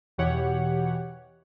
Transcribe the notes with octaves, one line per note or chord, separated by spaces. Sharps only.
E2 B2 E3 G4 C#5 F#5